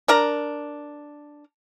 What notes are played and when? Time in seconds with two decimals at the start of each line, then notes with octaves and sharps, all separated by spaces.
0.08 D4 A#4 A#5